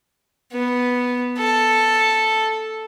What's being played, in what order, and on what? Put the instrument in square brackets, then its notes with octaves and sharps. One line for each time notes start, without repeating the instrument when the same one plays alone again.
[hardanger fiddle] B3
A4